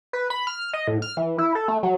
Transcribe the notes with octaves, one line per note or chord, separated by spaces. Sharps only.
B4
B5
F6
D#5
A2
F6
E3
E4
A4
A3
F#3